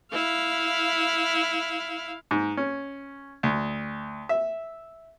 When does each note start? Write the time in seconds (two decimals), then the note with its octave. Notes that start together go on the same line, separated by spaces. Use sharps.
0.12 E4 F5
2.31 G#2
2.57 C#4
3.43 D2
4.29 E5